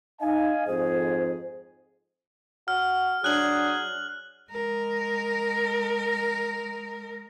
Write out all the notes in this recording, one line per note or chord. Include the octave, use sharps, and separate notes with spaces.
D#4 D#5 F5 G#5
F2 G#2 G#4 C5
F#4 F6
F#3 D4 G#4 F#6 F#7
G#3 A#4